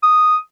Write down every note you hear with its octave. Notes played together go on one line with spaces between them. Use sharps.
D#6